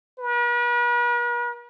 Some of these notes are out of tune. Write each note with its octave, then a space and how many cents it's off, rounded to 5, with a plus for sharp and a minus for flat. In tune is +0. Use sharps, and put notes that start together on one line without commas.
B4 -45